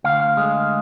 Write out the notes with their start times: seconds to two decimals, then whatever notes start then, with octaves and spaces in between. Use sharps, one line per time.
0.04 D2 F5
0.37 G#3